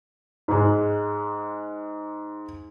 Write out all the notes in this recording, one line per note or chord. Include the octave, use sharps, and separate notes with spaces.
G#2 G#3